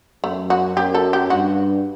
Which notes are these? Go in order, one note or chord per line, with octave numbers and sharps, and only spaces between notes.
F#2 A3
F#4
F#2 G4
A4
G4
G2 F#4